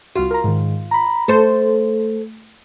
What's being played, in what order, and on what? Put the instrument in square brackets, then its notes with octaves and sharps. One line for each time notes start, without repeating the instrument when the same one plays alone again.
[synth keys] C2 F#4 [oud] F4
[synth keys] A#4 A#5
G#2 D#3
A#5 B5
[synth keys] A3 [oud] A4 C5